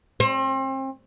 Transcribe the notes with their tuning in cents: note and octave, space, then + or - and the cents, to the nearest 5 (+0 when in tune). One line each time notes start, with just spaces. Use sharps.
C4 +35